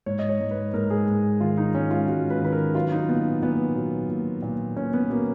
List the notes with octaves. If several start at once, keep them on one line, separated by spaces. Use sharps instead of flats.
G#2 C#5
D#5
C#5
G#2
B4
G#2 A#4
G#4
G#2
D#3 F4
D#4
G#2 C#4
F4
G#2 F#4
B4
D#3 B4
A#4
F#3 F4
D#4
A#2 B3
A#2 B3
F#3
A#2
A#2
A#2 C#4
B3
F#3 A#3